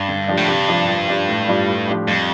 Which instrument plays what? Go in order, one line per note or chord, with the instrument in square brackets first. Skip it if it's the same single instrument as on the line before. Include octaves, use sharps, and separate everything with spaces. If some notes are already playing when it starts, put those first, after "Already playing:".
Already playing: [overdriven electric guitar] G2
[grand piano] D3
F3 D4 G4
[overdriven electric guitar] A2
[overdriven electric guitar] G2 [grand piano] C3
[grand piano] F3 D4 G4
F3
D4 G4
A2
G3 D4 F4
A2
F3 D4 G4
[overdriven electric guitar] F2 [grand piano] G3